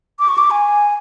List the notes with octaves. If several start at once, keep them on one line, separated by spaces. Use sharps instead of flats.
D6
C#6
D6
G#5